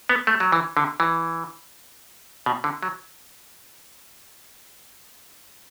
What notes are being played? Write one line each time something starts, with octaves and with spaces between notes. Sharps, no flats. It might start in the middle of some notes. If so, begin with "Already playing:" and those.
B3
A3
F#3
E3
D3
E3
B2
D3
F#3